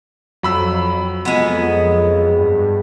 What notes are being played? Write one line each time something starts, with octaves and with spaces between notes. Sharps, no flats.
F2 F#3 B5 E6
F2 G#3 B3
G2